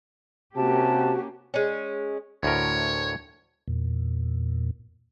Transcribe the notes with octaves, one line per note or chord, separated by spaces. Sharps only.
C3 A#3 C#4 F#4 G4 A5
G#3 C#4
D2 A2 A#4 C#5
E2 A#2